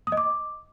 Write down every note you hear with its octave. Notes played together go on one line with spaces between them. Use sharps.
D#6
D#5
D6